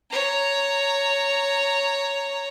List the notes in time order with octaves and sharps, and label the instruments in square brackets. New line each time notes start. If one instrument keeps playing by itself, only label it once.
[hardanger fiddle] C#5 A#5